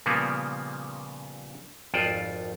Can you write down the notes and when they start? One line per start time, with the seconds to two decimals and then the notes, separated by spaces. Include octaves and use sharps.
0.06 A#2 C#3 F3 G3 A#3 B3
1.94 G#1 F2 F4 C5 D5